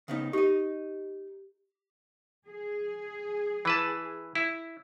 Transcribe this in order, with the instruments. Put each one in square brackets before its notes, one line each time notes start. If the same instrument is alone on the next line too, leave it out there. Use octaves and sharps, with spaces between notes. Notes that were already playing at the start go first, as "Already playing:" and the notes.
[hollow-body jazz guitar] C#3 B3 D#4
[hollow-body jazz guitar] D#4 D#5 [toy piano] G4
[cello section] G#4
[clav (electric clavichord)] E3 B4 A5
E4